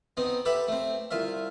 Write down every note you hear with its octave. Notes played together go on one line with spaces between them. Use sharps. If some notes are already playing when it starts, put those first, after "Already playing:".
B3 C4 D#4
G4 A4 B4 E5
A3 C4
C2 F4 E5